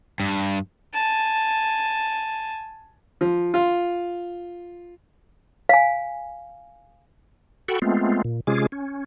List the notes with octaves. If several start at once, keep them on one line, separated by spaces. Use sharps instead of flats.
G2
G#5 A5
F3
F4
F5 G#5
F#4 A4 F#5 G5 B5 C#6
G#3 A3 B3 C4 F4
A#2
C3 G#3 C#4 F4 G#4 D6
C#4